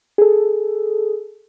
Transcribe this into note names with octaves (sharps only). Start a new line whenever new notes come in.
G#4 A4